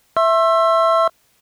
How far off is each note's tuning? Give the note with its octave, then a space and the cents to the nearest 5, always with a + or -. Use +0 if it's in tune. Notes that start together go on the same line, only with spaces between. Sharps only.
E5 +0 C6 +45 E6 +20